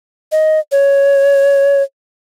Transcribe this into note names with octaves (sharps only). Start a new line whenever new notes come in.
D#5
C#5